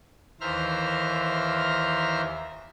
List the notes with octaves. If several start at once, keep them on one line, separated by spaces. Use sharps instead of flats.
D#2 E3 C5 E5 A#5 F6